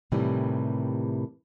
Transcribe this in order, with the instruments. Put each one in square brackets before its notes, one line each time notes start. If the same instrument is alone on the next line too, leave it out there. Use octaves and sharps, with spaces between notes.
[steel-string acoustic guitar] A2 C3 D#3 E3 G3